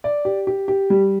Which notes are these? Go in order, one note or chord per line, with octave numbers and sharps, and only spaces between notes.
D5
G4
G4
G4
G3